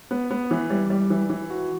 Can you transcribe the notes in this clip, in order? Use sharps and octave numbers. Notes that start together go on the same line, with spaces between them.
B3
B3
E3
G3
G3
E3
E3
F#4